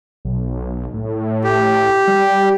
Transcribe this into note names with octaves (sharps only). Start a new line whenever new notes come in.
B1
A2
G4
G3